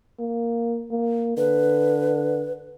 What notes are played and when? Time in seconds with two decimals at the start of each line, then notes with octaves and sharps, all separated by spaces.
0.19 A#3
0.91 A#3
1.37 D3 B4